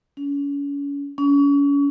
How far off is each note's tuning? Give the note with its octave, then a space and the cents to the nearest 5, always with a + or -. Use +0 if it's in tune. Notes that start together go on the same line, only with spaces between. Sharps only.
C#4 +35
C#4 +35